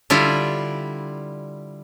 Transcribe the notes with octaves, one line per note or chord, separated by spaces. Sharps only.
D3 G3 E4 F4